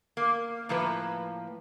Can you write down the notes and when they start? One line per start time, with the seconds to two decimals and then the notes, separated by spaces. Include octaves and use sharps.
0.17 A#3
0.69 A2 F3 A#3 B4